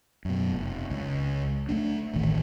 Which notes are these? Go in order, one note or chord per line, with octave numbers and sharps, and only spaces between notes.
F#2 B2
F1
C#2
A3 B3 D4
D1 A1 D#3